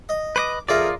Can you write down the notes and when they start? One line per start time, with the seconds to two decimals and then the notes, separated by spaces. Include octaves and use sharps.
0.09 D#5
0.36 B4 C5 D#5 D6
0.69 F2 F4 G#4 A#4 D5 E5 A#5